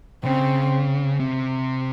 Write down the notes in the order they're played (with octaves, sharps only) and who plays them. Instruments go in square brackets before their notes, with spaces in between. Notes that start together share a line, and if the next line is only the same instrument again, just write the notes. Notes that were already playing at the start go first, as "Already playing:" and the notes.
[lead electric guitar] C#3 [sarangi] C4
[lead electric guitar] C3